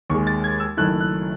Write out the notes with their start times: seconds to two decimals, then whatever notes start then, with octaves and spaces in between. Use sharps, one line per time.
0.10 D#2 D#3 G#3 C#6
0.27 A6
0.44 G#6
0.60 E6
0.77 F#1 F#2 D#3 A3 E4 F#6
1.01 F#6